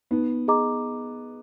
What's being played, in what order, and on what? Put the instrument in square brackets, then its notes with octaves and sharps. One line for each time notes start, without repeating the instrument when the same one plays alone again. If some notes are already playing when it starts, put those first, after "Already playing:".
[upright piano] B3 [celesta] D#4
[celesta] G#4 D#5 A#5 D6